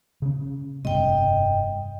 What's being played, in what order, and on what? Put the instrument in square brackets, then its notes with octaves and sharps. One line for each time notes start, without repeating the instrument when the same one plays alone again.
[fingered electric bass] C#3 C#4
[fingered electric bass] F1 G2 C3 [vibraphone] D#5 G5